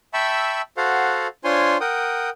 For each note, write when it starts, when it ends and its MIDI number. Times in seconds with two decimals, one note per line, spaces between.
0.14 0.61 76
0.14 0.61 79
0.14 0.61 81
0.14 0.61 83
0.14 0.61 85
0.14 0.61 88
0.77 1.27 66
0.77 1.27 69
0.77 1.27 72
0.77 1.27 77
0.77 1.27 78
1.44 1.78 62
1.44 1.78 65
1.44 1.78 72
1.44 1.78 73
1.44 1.78 80
1.44 1.78 84
1.81 2.30 70
1.81 2.30 78
1.81 2.30 79
1.81 2.30 87